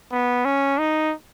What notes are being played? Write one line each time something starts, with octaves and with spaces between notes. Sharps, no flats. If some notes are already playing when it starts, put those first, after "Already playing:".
B3
C#4
D#4